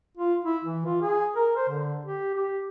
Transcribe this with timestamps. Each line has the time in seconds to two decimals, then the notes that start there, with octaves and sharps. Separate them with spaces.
0.17 F4
0.45 E4
0.64 E3
0.85 F4
1.02 G#4
1.36 A#4
1.57 C5
1.69 D3
2.06 G4
2.35 G4